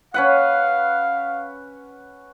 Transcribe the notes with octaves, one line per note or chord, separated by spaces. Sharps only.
C#4 B4 F5 F#5